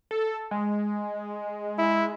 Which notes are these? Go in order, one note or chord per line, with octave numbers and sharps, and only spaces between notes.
A4
G#3
E4